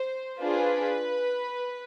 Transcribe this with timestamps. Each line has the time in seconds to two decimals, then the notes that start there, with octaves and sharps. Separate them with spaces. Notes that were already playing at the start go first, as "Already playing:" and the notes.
Already playing: C5
0.41 D4 F4 G#4 B4